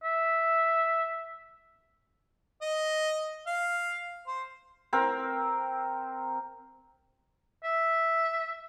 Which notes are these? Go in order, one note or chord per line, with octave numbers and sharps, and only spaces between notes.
E5
D#5
F5
C5
C4 A#4
E5